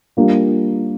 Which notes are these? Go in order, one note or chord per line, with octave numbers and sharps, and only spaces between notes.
G3 A#3 D4 F4